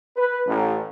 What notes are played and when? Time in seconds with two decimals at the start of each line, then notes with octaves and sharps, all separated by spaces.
0.17 B4
0.46 A1